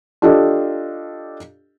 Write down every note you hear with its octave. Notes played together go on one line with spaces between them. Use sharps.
D4 F4 G4 A4 D#5